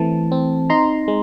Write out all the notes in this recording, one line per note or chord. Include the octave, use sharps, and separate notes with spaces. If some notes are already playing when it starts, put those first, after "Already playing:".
Already playing: E3 A3 C4 A5
C4
D#4 A#5 C6
G#3